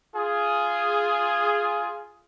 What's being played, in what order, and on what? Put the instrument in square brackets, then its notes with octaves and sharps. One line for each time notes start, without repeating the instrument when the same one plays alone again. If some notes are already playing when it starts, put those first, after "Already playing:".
[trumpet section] F4 G#4